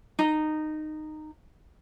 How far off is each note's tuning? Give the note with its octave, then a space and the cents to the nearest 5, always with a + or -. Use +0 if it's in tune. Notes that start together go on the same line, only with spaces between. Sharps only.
D#4 -15